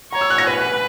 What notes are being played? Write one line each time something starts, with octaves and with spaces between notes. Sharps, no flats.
C#5 A#5
E6
F#6
A#6
B4